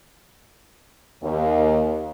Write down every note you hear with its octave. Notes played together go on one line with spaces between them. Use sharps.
D#2